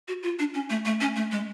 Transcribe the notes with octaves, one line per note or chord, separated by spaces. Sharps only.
F#4
F4
D4
C#4
A3
A3
C#4
A3
G#3